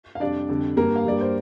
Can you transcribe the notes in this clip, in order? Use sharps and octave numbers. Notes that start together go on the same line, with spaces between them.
F5
F2 C3 G3 D4 D5
F2 D3 G3
G2 G3 A#3 A#4
F5
G2 G3 D5
C5